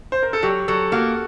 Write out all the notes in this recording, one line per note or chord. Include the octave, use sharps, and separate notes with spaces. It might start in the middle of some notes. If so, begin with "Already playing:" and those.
C5
A#4
A4
F#3 G4
F#3 A4
A#3 F#4